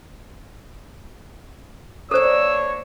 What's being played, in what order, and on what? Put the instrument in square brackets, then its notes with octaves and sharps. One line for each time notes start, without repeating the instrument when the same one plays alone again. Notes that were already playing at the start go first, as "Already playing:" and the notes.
[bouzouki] A#3 D4 [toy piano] A4 C5 [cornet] C#5 [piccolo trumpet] E6